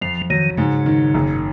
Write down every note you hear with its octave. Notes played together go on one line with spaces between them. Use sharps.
F2 F3
D#3 F#3
G#2 C#3
D#3
F#1